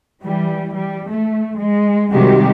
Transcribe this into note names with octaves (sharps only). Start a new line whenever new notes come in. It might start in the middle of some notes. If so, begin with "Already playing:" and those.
E3 G3
G3
A3
G#3
C3 D#3 G3 G#3 F#4 G4